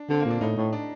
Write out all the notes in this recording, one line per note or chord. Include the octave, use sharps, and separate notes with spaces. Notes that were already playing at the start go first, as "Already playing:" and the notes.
Already playing: D4
D3 C4
A#3
A#2
D4
A2 D#4
A2
D4